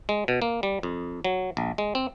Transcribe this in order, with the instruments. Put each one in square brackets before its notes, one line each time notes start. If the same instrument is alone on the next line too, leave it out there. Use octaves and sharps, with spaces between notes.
[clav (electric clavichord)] G#3
B2
A#3
G3
F2
F#3
A#1
G#3
C4